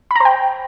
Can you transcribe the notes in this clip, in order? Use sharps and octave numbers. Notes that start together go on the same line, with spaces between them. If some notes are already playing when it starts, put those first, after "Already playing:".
C5 G5 A#5 B5